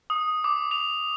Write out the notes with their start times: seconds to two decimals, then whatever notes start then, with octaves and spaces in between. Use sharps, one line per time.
0.10 D#6
0.44 D6
0.71 F7